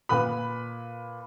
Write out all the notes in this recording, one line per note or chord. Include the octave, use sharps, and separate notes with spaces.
A#2 B4 B5